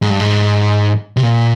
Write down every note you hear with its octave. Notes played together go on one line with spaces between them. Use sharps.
G#2
G2
G#2
C3
A#2